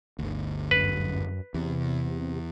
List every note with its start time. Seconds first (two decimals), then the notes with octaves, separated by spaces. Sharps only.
0.19 G1 D2
0.71 F#2 B4
1.54 E2 C3